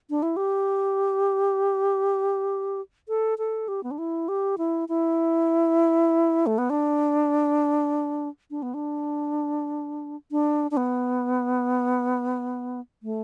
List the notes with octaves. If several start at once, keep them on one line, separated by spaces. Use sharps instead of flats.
D4
E4
G4
A4
A4
G4
B3
D4
E4
G4
E4
E4
A3
B3
D4
D4
B3
D4
D4
D4
B3
A3